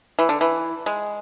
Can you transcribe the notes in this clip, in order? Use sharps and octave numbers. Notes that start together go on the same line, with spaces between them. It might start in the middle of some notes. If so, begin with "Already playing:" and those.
E3
D3
E3
G#3